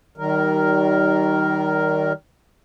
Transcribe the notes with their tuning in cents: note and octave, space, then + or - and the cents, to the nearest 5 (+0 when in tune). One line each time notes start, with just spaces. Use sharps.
D#3 +0 G3 -40 A#4 +0